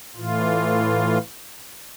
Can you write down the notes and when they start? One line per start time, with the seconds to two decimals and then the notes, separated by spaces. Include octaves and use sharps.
0.16 A2 E3 F4